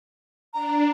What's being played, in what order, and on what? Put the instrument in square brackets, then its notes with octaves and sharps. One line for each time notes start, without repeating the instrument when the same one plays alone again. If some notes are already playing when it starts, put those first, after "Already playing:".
[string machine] D4 [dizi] A#5